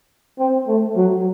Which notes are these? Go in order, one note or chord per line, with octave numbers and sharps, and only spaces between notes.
C4
A3
F#3